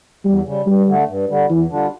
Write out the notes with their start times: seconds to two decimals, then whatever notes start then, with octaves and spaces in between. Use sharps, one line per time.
0.25 E2 G3
0.46 C#3 G3
0.66 G2 G3
0.87 D3 A3
1.09 G2
1.29 D3 G3
1.50 E2 E3
1.70 D3 G3 D4 F4